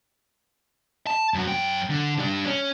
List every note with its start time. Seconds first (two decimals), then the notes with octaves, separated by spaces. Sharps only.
1.07 A5
1.34 F#2 F#4
1.47 F#2 G5
1.90 D3
2.19 G3 D4
2.46 C#4